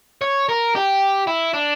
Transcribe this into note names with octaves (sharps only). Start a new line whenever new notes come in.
C#5
A#4
G4
E4
D4